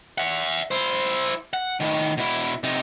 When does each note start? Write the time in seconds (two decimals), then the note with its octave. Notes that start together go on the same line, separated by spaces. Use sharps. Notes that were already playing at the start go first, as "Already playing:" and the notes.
0.18 E5 F#5
0.71 E4 C5
1.53 F#5
1.80 A2 D#3
2.17 B2 E4
2.64 C3 D#4